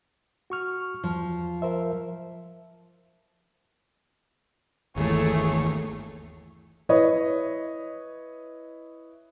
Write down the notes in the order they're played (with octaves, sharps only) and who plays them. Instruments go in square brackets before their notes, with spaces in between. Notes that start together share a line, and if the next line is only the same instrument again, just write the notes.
[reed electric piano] F#4 C#6 F6
[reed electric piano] E2 [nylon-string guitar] F3
[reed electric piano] A#4 C5 E5
[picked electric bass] G1 D#2 E3 [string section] A3 [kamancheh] G#4 C#5
[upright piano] E4 B4 C#5 D#5